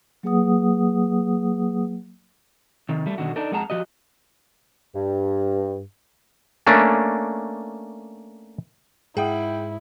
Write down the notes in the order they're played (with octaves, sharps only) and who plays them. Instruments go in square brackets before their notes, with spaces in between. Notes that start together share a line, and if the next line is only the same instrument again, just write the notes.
[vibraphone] F#3 A#3 G#4 B4 F#5 D#6
[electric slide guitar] C3 D#3
G3 A3
B2 D3 D#3 F#4
D4 D#4 A4 A#4
F2 G#3 G#4 F#5 A5 A#5
F3 F#4 G4 D#5
[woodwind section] G2
[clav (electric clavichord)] A3 A#3 C#4 D4
[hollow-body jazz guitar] G#2 [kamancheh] E4 [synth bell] G#4 [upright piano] F#5 G5 D#6